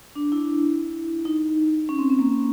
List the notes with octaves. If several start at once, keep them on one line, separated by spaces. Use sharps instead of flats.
D4
E4
D#4
C#4
C4
C4
A#3